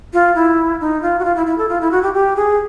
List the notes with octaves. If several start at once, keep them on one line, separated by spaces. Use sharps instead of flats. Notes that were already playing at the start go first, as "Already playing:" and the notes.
F4
E4
D#4
F4
F#4
F4
E4
E4
A4
F4
E4
F#4
G4
G4
G#4